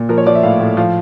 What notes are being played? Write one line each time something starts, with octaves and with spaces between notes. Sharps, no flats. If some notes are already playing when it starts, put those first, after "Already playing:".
Already playing: A#2
F3 A#4
C#5
F3 D5
E5
A2 F5
A2
F3 F5